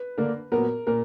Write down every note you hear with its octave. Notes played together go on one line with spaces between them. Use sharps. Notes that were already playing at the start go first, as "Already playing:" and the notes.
Already playing: B4
D3 A#3 D4 A#4
A#2 F#3 B3 A#4
A#2 A#4